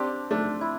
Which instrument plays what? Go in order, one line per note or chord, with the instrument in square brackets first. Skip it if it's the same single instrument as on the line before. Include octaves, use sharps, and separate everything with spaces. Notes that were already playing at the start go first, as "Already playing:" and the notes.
Already playing: [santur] C4 D4 [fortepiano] G4
[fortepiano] A3 [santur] D4
[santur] E4